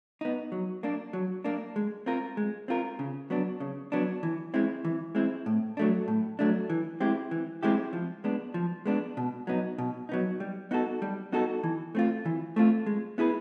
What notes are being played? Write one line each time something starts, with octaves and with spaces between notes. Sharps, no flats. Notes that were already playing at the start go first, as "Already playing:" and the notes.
B3 D#4
F#3
A#3 D4
F#3
A#3 D4
G#3
C4 F4 A#4
G#3
C4 F4 A#4
C#3
F#3 B3 D4
C#3
F#3 B3 D4
E3
G#3 C4 E4
E3
G#3 C4 E4
A2
F#3 A3 D4
A2
F#3 A3 D4
E3
G#3 C4 E4 G4
E3
G#3 C4 E4 G4
F3
G#3 B3 D4
F3
G#3 B3 D4
B2
F#3 B3 D#4
B2
F#3 B3 D#4
G3
B3 D#4 F#4 A4
G3
B3 D#4 F#4 A4
E3
A3 C4 F4
E3
A3 C4 F4
G#3
B3 E4 G#4 B4